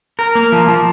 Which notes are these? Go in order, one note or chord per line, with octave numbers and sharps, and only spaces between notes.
A#4
A#3
F3
F3